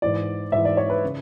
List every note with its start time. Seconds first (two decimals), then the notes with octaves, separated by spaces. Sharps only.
0.02 G#2 E3 D5
0.52 G#2 E3 E5
0.65 D5
0.77 C#5
0.90 B4
1.04 C#3